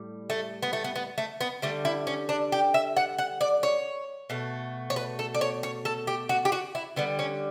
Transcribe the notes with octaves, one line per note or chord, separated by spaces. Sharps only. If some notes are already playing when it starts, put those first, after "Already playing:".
Already playing: A2 G3
A3
B3
A3
B3
B3
A3
B3
D3 G3 A3
E4
C#4
D4
G4
E5
F#5
F#5
D5
C#5
B2 A3
C#5
B4
A4
D5
C#5
C#5
A4
G4
F#4
G4
F#4
E4
D3 G3 B3
C#4